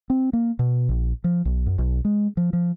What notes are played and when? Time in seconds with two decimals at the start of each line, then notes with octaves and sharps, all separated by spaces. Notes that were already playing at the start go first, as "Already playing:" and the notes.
0.10 C4
0.33 A#3
0.59 B2
0.89 A#1
1.24 F3
1.45 B1
1.66 F#2
1.78 B1
2.05 G#3
2.37 F3
2.53 F3